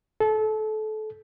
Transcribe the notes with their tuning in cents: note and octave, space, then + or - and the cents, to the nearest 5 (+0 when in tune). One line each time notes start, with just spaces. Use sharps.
A4 -25